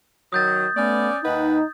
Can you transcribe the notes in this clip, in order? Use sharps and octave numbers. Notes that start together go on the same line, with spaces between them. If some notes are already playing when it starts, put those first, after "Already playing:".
D#3 F#3 D#6 G6 A6
A3 B3 C#4 D5
D#2 D#4 B4 F#5